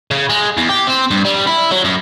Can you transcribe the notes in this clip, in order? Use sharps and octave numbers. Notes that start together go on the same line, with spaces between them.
C#3
G#3
E2
G4
C4
G2
G3
E4
F#3
F#2